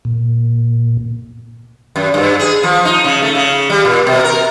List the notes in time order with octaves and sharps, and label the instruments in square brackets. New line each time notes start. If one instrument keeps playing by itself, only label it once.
[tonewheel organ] A#2
[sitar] F#2
G2
G#4
F3
D#4
C#3
A3
C#3
G3
A#2
B2
A#4